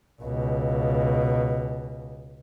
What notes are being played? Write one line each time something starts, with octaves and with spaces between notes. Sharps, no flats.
C#2 B2